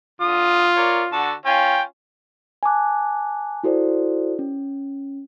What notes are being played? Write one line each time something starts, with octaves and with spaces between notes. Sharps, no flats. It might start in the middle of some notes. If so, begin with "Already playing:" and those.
D3 F4 D#6
A#4 C#5 D5
D3 F#4 A5
C#4 F4 G5 G#5
G#5 A5 D6 F#6
E4 F#4 A4 C5 D5
C#4